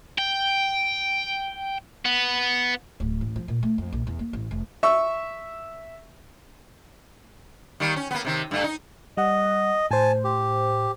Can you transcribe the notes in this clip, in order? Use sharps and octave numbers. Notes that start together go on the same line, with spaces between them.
G5
B3
D1
A1
F3
A#2
A3
F2
A#1
E2
A#3
A1
F1
E5 C#6 E6
D#3 G3 A#3
C#4
A#3 B3
C3 D#3
G2 A3
D#4
G3 D#5 F#5
A2 C5 G#5 A5
G4